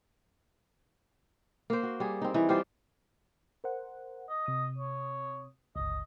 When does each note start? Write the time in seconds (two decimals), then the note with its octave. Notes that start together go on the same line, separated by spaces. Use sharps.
1.70 A#3 C5
1.83 F#4
2.00 G3 G#4
2.22 C4 D#4
2.34 E3 D#4
2.49 G3 F4 G4 C5
3.64 A#4 C5 F#5
4.29 D#5
4.46 C3 D#6
4.78 C#5
5.76 G1 C#2 D#5